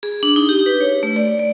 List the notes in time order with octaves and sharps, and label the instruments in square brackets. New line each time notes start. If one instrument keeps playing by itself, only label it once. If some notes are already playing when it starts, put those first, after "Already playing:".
[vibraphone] G#4
D4
D#4
G4
B4
C#5
A3
D5
D5